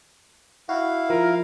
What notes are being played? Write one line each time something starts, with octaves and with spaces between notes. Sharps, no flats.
E4 F#4 F5
F3 A#4